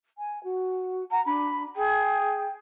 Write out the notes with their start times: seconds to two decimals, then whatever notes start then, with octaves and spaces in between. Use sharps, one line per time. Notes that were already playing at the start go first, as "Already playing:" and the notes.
0.18 G#5
0.43 F#4
1.11 F#5 A#5
1.26 D4 B5
1.76 G#4 G5